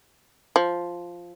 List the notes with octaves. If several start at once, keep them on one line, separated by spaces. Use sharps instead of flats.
F3